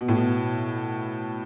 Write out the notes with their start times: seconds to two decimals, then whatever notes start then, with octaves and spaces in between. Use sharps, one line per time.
0.01 B2
0.08 A2
0.16 B2